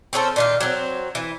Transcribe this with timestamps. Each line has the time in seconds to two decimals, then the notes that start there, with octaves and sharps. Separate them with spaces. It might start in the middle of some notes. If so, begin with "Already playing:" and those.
0.13 C4 C#4 G#4 A4
0.36 A#2 D#3 F4
0.60 F#3 C4
1.15 E3